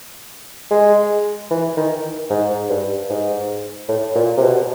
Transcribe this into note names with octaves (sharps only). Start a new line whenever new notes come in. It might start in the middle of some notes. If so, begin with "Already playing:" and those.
G#3
E3
D#3
G#2
G2
G#2
A2
A#2
C3
B2